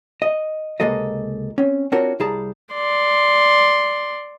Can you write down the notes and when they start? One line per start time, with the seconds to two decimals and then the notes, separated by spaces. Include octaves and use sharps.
0.22 D#5
0.80 C#2 C3 G#3 A#3 A4 D#5
1.58 C4 C#4
1.92 C4 D4 F4 F#4 A#4 C#5
2.20 C2 G3 E4 G#4 A5 A#5
2.74 D5 C6